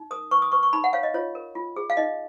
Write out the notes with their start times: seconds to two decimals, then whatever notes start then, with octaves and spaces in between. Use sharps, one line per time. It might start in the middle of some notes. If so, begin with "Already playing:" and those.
Already playing: D#4
0.11 A#4 D#6
0.31 B4 C#6
0.42 D#6
0.52 B4 C#6
0.63 C#6
0.73 D#4 B5
0.84 F#5
0.93 C#5 F5
1.03 D#5
1.14 F4 C#5
1.35 A#4
1.55 F4
1.76 G#4
1.90 F5
1.97 D#4 D#5